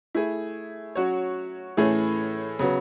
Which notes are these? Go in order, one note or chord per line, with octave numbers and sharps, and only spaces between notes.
A3 E4 G#4
F#3 C#4 F#4 C#5
A2 E3 A3 C#4 G#4
C#3 F#3 B3